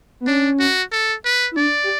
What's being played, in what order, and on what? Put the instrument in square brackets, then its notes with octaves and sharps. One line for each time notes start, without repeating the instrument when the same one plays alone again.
[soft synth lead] B3
[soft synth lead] C#4 [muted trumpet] D4
[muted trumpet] F#4
A4
B4
[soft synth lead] E4
[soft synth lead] D4 [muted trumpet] D5
[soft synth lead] G4